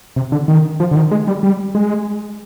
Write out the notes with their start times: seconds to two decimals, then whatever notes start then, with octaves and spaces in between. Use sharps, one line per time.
0.16 C3
0.32 D3
0.48 D#3
0.80 F3
0.91 D3
0.96 D#3
1.11 G#3
1.27 G3
1.43 G3
1.75 G#3